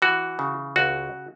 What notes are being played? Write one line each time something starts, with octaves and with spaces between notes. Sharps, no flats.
E3 F#4
C#3
C#2 F#4